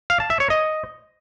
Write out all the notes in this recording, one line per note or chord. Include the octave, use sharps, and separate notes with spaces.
F5
A5
E5
C#5
D#5